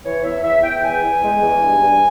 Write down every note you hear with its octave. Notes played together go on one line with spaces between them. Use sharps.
E3 C#5
E2 E5
E2 E5
E2 G5
E2 G#5
E2
G#3
E2
G2
G2